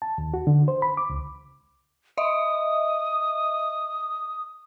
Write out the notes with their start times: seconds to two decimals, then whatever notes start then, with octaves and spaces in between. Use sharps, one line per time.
0.02 A5
0.18 D#2
0.34 F#4
0.47 D3
0.68 C5
0.82 B5
0.97 D6
1.10 C#2
2.18 D#5 E5 D#6